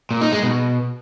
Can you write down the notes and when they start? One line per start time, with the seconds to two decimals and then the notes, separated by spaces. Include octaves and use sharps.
0.11 A#2
0.21 D#4
0.32 G#3
0.43 B2